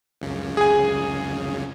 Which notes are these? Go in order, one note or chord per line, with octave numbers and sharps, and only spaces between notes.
C#2 F#2 C#3
G#4 G#5